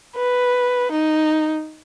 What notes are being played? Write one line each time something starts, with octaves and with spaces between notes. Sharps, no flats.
B4
D#4